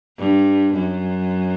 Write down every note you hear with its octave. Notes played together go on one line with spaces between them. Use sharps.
G2
F#2